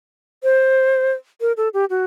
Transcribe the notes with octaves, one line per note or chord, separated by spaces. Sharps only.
C5
A#4
A4
G4
F#4